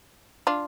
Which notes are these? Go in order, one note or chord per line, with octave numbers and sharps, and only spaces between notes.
D4 F4